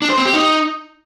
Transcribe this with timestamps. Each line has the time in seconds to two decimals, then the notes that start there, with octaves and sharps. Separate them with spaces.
0.02 D4
0.10 C5
0.18 C4
0.25 G4
0.33 D#4